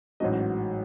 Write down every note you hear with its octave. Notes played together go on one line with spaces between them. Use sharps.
A1 G#2 F#3 D#5